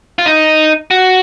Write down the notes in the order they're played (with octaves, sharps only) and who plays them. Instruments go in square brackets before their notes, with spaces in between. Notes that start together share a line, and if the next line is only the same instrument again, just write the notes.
[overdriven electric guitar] F4
D#4
F#4